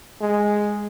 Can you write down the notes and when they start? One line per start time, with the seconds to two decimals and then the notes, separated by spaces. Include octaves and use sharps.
0.21 G#3